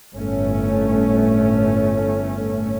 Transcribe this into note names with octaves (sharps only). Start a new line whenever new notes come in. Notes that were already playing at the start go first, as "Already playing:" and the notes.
G1 A2 A3 C#4